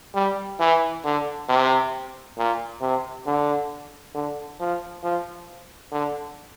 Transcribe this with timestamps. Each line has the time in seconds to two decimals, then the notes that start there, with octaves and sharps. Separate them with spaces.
0.15 G3
0.60 E3
1.04 D3
1.49 C3
2.38 A#2
2.81 C3
3.26 D3
4.15 D3
4.60 F3
5.03 F3
5.92 D3